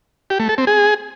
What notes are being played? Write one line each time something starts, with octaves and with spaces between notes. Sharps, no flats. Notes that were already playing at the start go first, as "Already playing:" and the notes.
G4
A3
A4
C4
G#4